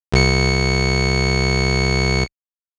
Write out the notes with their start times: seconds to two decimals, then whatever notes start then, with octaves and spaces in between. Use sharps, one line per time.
0.12 C2 C#7